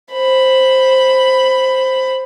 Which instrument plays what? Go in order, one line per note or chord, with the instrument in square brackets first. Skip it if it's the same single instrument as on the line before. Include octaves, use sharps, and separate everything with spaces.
[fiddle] C5 B5